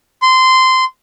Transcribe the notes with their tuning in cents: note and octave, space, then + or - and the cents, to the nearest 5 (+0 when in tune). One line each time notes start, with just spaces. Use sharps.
C6 -15